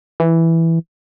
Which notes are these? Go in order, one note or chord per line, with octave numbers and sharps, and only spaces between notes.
E3